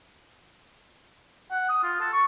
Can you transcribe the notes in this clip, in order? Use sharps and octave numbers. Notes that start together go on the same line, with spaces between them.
F#5
D#6
F4
A4
C#6